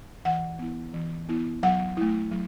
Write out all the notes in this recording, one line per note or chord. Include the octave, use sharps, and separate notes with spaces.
E3 F#5
B3 E4
E3
B3 E4
F#3 F#5
A3 E4
F#3